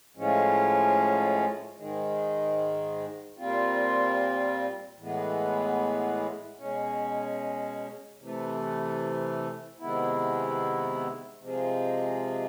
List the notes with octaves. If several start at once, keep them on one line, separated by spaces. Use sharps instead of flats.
A2 F3 G#3 C#4
G#2 D#3 G#3
A#2 G3 C4 F4
A2 E3 G#3 B3
B2 G#3 C#4
C3 E3 A3
C3 D#3 G#3 B3 E4
C3 F3 G#3